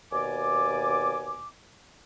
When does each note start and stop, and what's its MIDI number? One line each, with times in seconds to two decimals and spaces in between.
0.13 1.48 39
0.13 1.48 47
0.13 1.48 74
0.13 1.48 80
0.13 1.48 86